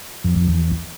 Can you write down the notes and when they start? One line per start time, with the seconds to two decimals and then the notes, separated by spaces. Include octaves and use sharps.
0.24 F2
0.36 F2
0.48 E2